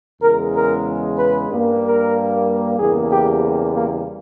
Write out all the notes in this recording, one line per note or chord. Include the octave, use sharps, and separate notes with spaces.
E2 C#3 G#3 A#4
A#4
B4
G2 G3 A#3
A#4
E2 C#3 G3 A#3 G#4
G4
A#3